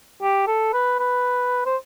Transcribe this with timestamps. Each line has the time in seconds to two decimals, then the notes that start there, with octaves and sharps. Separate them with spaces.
0.22 G4
0.47 A4
0.73 B4
0.99 B4
1.66 C5